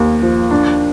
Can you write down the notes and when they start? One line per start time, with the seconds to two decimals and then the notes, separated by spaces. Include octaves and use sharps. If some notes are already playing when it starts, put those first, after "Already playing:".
Already playing: D#2 A#3
0.22 F3
0.51 D4